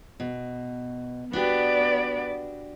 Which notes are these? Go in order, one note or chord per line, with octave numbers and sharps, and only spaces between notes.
B2
B3 D4 F#4 G4 D5